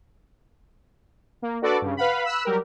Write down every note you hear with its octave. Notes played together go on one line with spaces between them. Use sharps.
A#3
D4 F#4 A4 B4 D5 D6
G2 C#3
B4 F5 F#5 B5
B5 E6 F#6
F#3 G3 G4 A#4